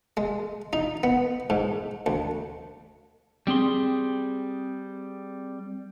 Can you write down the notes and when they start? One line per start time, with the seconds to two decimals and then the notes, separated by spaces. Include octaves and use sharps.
0.17 G#3
0.73 D#4
1.03 B3
1.50 G#2
2.06 D2
3.47 G3 C4 G#4 C6